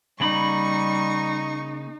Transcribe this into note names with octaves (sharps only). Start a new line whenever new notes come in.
C#3 G3 A#3 D#4 B5 C#6